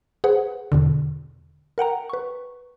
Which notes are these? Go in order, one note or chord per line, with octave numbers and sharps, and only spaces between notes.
G#4 B4 C5 F#5
E2 B2 D3
A#4 F#5 G5 A#5
B4 C#6